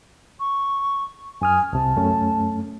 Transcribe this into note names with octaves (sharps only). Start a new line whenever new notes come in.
C#6
F#2 G#5 D#6 F6
C2 C3 A5
F#2 A3 C#4